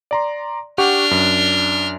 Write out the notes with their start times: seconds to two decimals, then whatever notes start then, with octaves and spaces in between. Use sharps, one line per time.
0.11 D5 A#5 C6
0.78 D4 G4 F#5 C#6 F6
1.11 F#2